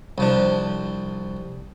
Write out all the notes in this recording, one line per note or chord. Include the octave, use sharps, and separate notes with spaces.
C2 F3 D4